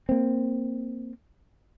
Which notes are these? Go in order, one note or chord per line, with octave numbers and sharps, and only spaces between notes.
A#3 C4